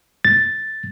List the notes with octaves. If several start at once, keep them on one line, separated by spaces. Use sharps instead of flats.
A6